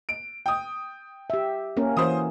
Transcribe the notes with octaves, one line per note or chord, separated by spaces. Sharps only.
D7
G5 D#6
G4 E5
A#3 C#4 A#4
E3 C#4 F#4 C5 D#6